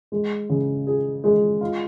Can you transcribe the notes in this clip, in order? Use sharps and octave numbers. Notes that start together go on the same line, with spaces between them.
G#3
C#3
G#4
G#3
F4